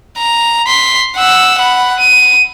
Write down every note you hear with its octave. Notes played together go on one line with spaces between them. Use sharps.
A#5
C6 B6
F#5 E6
F#5 B5
D#7